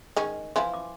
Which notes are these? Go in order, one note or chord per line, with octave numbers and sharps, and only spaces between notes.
D#3 G#3 C#4
E3 F3 E4 F5 G#5 C6
D6